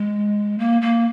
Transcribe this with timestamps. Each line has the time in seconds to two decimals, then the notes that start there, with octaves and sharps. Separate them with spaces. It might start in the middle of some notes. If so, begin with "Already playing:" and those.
Already playing: G#3
0.58 A#3
0.81 A#3